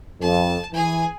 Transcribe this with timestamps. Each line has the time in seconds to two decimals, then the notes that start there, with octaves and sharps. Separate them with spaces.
0.21 F2 A5
0.73 E3 G#4 G#5